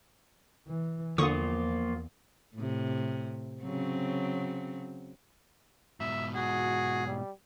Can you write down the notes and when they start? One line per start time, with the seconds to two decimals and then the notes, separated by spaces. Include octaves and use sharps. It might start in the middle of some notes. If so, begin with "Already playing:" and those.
0.68 E3
1.18 E2 D3 F3 A#3 F4 C#6 D#6
2.56 A2 C3
3.63 C#3 F#3 C4
6.00 G#2 B2 E5
6.35 F#4 G#4
7.06 G3